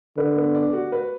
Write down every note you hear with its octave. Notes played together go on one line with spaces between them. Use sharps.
D3 B4
B3
D5
F#4
B4